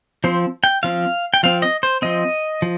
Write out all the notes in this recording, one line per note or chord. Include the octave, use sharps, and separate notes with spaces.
F3 C4 C5
G5
F3 C4 F5
G5
F3 C4 F5
D#5
C5
F3 C4 D#5
F3